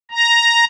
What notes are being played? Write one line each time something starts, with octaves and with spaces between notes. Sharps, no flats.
A#5